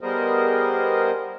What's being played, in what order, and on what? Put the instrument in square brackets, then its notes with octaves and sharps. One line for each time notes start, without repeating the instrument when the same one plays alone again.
[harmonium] G3 B3 G#4 A#4 C5 D#5